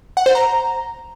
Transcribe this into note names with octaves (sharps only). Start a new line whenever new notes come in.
F#5
C5
A#5